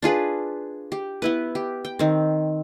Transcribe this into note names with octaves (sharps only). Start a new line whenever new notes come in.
D4 F4 G#4 B4
G4
B3 E4 B4
G4
G5
D#3 C4